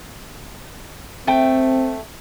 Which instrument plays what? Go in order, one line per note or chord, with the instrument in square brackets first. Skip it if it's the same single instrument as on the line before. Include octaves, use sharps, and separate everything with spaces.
[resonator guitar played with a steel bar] A3 G5 [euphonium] C4